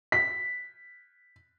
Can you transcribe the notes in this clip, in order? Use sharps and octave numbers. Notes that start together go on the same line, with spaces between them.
B6